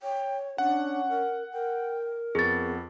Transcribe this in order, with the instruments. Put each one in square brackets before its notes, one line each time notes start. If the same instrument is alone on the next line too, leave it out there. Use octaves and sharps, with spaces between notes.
[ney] C#5 [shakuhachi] G5
[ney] C#4 [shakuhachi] D4 [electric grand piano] F#5
[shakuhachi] A#4
[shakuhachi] A#4 [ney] G5
[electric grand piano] F2 [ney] B3 [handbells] G#4 A6